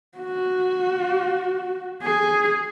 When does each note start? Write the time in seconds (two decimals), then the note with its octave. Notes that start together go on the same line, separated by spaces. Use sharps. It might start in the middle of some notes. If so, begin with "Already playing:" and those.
0.18 F#4
2.02 G#4